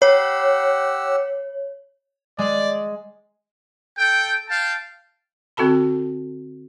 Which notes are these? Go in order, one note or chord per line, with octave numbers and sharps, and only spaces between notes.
G4 C#5 F#5 E6
G#3 D5
A4 G5
F5 G5 A5
D3 C4 F#4 A4 A5 B5